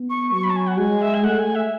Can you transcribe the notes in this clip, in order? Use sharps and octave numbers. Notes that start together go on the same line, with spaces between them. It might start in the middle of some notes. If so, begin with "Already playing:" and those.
Already playing: B3
C#6
F#3 C#6
B5
A5
G#5
F#5
G#3 G#5
E5
G#5
A3 F#5
G#5
E5